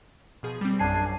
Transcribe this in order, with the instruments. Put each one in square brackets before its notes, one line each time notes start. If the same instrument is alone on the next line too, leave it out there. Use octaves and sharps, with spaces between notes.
[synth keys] B2 F3 G#4
G3 C4
[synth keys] A#1 F#2 C7 [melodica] D4 G#5